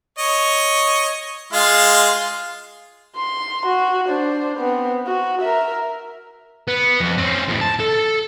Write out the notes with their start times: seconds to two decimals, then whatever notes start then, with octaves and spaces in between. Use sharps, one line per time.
0.18 C#5 D#5
1.53 G#3 F4 F5
3.17 C6
3.66 F#4
4.08 D4 C5
4.58 B3 C4
5.06 F#4
5.41 A#4 E5
6.68 B3
7.01 F2
7.18 C4 C#4
7.48 F2 A2
7.61 A5
7.80 A4